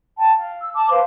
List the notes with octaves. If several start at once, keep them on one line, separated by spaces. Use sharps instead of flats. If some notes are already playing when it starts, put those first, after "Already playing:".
G5 A5
F5
E6
A5 D6
B4 C5 F5